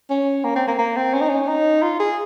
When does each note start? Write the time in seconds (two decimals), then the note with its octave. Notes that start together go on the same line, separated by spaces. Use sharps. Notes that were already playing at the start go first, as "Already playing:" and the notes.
0.10 C#4
0.44 A#3
0.56 C4
0.68 A#3
0.79 A#3
0.96 C4
1.14 C#4
1.21 D#4
1.29 C#4
1.48 D#4
1.83 F4
2.00 G#4